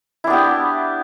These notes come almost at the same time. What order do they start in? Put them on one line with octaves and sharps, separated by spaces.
E4 D4 B3 G4